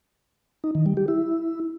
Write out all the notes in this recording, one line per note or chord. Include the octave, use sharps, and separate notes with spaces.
D#4
D#3
G3
G4
E4